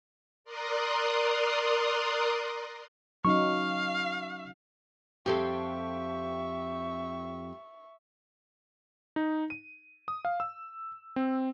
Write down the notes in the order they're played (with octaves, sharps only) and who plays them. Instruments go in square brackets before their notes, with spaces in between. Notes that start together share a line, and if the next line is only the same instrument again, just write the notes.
[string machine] A#4 D5 A#5 C6 D#6 F#6
[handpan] F#3 C#4 D#4 [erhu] F5 [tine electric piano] C#6
[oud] F2 C4 A4 [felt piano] G4 [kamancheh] E5 C#6
[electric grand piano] D#4
D#7
D#6
F5
E6
C4